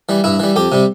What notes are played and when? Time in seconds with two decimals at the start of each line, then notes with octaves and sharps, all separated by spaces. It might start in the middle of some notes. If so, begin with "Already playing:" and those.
0.09 E3 G3
0.24 G2 E4
0.40 E3 G3
0.56 F2 G4
0.72 C3 G3